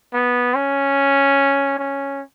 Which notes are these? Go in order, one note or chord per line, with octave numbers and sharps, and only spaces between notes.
B3
C#4
C#4